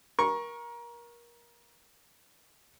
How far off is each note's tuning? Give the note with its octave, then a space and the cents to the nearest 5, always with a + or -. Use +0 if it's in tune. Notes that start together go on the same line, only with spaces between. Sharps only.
A#4 +25 C#6 -10